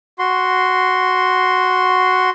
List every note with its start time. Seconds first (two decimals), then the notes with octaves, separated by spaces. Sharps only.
0.19 F#4 C6